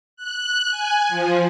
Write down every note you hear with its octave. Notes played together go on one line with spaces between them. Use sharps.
F#6
G#5
F3